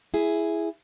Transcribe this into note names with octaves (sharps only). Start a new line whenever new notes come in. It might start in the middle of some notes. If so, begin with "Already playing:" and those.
E4 G#4